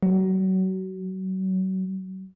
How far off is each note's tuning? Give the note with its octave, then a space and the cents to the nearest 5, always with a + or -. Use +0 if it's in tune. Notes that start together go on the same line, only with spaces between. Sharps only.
F#3 +30